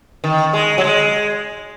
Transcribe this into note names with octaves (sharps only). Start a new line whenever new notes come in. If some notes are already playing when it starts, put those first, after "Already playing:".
D#3
G#3
F#3
G#3